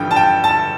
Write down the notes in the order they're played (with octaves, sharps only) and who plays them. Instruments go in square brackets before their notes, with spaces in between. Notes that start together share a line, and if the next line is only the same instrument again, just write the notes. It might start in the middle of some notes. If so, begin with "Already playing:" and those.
Already playing: [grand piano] A1 G2 D3 F3 G5
A5
G5
A5